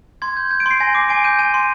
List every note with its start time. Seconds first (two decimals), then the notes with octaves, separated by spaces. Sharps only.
0.22 C6 G#6
0.37 G6
0.51 G6
0.60 D7
0.66 C6 C7
0.80 G#5 A#6
0.95 D6 C7
1.09 G#5 D7
1.24 G6 D#7
1.39 G#5 D#7
1.54 C6